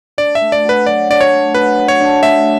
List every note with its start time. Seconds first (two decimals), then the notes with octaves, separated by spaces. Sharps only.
0.18 D4 D5
0.35 E5
0.41 A3
0.52 D5
0.64 F#4 B4
0.86 F#3 D5
1.09 D4 D5
1.21 C#5
1.32 A3
1.54 F#4 B4
1.77 F#3
1.88 C#5
2.00 D4
2.23 A3 E5